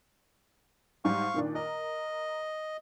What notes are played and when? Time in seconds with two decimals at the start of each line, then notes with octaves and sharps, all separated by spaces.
1.05 G#2 G3 F5 C#6
1.34 A#2 D#3 D4
1.55 A#4 D#5